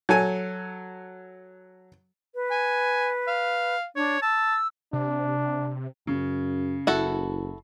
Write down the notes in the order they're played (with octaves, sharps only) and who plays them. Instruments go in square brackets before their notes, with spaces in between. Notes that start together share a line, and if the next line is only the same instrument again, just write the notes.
[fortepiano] F#3 A4 G#5
[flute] B4
[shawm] G#5
F5
[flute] D4 [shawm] C#5
[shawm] A5 [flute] E6
[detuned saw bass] C3 [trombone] D4
[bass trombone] F#2 [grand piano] C#3
[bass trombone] F#1 [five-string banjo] E4 F#4 A4